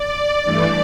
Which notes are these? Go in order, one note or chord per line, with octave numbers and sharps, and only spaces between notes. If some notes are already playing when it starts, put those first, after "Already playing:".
Already playing: D5
G2 E3 A3